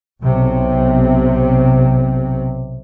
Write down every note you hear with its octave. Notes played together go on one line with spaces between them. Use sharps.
B1 C3